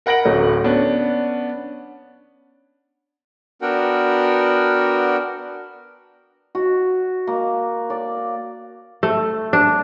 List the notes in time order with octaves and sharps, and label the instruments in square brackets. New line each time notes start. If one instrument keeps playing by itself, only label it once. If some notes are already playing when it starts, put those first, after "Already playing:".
[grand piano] A#4 F#5 B5 A#6 D7 F#7
D1 F#3 A3 C#4
B3 C#4 D4
[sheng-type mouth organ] B3 D4 F#4 A#4 F#5 G5
[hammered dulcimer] F#4
A#3
D5
[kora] A3
D4